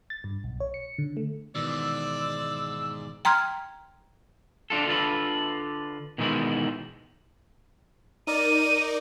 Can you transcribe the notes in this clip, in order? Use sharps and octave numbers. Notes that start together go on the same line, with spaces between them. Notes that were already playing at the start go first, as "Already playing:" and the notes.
A6
G2
B1
C#5
C#7
D3
A3
G#2 B2 D#3 E3 D5 E6
G5 A#5 C6 F6 G#6
D4 F4 A4
D3 F4 A4 B4
B2 D#3 E3 G#3 D#4 E4
D#4 A#4 D5 D#7